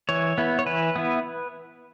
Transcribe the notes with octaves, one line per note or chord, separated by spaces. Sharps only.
E3 C#5
B3 E4
C#5
E3 B4
B3 E4